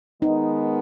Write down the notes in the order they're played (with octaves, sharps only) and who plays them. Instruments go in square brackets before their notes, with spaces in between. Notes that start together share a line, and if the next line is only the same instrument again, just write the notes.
[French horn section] D#3 G#3 B3 [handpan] D#4